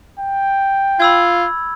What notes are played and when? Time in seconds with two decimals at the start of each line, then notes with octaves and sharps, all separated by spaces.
0.20 G5
1.00 F4 B5 E6 G#6